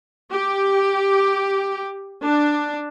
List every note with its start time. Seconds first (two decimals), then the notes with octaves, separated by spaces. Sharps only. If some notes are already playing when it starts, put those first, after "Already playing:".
0.32 G4
2.21 D4